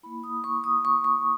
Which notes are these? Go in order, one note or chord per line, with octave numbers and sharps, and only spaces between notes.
A#3 E4 B5
D#6
C#6
D#6
C#6
C#6